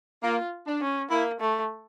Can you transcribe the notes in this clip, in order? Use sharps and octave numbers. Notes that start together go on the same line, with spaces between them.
A#3 F4
D4
C#4
A#3 E4
A3